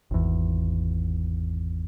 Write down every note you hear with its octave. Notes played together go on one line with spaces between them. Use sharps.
G#1 E2